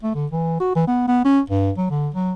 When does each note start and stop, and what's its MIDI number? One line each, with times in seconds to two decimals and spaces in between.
0.03 0.14 57
0.15 0.26 50
0.31 0.60 52
0.60 0.72 66
0.76 0.86 52
0.87 1.04 59
1.08 1.23 59
1.25 1.41 61
1.50 1.71 43
1.78 1.90 54
1.91 2.09 50
2.15 2.33 54